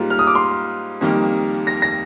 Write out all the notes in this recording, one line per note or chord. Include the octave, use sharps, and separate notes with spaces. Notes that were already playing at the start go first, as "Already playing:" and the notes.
Already playing: G#2 G3 A#3 F4
F6
D#6
D6
C6
F2 D#3 G3 A#3
A#6
A#6